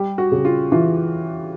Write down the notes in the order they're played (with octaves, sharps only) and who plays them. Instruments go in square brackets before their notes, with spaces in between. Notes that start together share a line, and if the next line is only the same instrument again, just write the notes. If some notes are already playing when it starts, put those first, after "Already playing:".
Already playing: [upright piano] G3 G4
F#4
C#3
F4
E3 F4